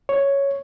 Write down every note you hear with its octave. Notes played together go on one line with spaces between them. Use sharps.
C#5